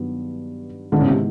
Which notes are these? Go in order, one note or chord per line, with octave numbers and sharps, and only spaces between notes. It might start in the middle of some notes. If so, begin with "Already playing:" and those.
Already playing: G2 D#3 F#3 B3
G#2 D3 D#3 G#3 B3 E4
C#3
C3